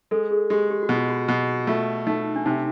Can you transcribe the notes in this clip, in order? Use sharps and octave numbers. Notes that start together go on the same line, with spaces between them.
G#3 A4
G#4
G#3 G4
G4
F#4
B2
F4
F#4
B2
A3 F4
A3 D#4
D4
C3 D#4